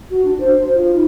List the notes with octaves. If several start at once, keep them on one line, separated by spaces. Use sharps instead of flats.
F#4
D4
C5
F4
D#4